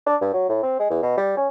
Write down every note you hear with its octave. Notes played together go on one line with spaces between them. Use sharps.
D4
G2
F#3
A2
C4
G#3
E2
B2
G3
C#4